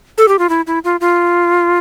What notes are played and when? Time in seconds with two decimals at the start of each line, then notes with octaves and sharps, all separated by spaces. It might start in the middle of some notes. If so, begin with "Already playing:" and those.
0.18 A4
0.28 G4
0.39 F4
0.49 E4
0.67 E4
0.84 F4
1.01 F4